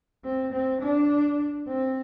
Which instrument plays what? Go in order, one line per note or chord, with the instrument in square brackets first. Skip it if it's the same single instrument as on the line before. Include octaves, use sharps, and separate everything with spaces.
[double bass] C4
C4
D4
C4